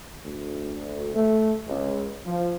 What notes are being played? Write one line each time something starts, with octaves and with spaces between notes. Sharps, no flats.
D2
A3
C#2
F3